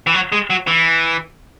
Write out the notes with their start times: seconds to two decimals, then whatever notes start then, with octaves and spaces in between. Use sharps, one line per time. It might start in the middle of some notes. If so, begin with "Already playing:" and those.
0.07 E3
0.14 F#3
0.32 G#3
0.50 F#3
0.67 E3